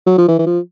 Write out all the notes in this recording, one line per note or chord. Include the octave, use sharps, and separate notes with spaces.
F#3
F3
E3
E3
F3